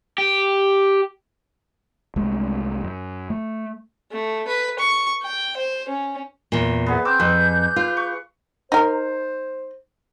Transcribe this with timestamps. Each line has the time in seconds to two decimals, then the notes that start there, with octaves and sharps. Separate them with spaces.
0.18 G4
2.16 C2 G#3 A3
2.84 F#2
3.30 A3
4.11 A3
4.47 B4
4.79 C#6
5.22 G5
5.57 C5
5.88 C#4
6.52 E2 A#2
6.86 B3 G#4 D5 E5 F#5
7.05 C4 D6 E6 G6
7.20 F2 B4
7.76 F4 B4
7.97 C#6
8.72 D#4 A#4 C5